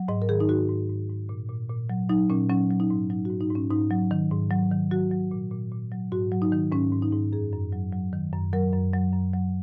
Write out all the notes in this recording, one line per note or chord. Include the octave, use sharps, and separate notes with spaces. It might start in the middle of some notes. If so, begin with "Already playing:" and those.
Already playing: F#3
G#2 D#5
A#4
D#3 G#4
D#4
G#2 F#4
G#2
G#2
G#2
A#2
A#2
A#2
F#3
F#3 D#4
A#2 C#4
F#3 C#4
F#3
D#4
G#2
F#3 D#4
F#4
G#2
D#4
G#2 C#4
G#2 D#4
F#3
D#3
G#2
F#3
D#3
F#3 F#4
F#3
A#2
A#2
A#2
F#3
G#2 F#4
F#3
D#4
D#3
G#2 C#4
G#2
D#4
G#2
F#2 G#4
F#2
F#3
F#3
D#3
F#2
F#3 A#4
F#2
F#3
F#2
F#3